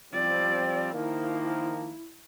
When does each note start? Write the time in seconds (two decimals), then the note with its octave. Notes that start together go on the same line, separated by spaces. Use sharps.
0.13 F3 G3 C4 D5
0.93 D#3 F3 A#3 E4